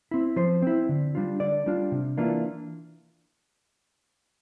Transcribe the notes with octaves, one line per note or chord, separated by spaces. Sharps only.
C4 E4
F3 C5
C4 E4
D3
G3 D4 F4
D3 D5
G3 D4 F4
C3
E3 A#3 D4 F4